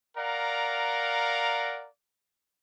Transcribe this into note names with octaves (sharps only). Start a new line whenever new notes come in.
A#4 D5 F5 F#5 A#5